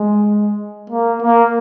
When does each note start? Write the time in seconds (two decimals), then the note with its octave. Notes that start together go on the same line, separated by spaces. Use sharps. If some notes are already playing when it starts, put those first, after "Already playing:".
Already playing: G#3
0.90 A#3
1.23 A#3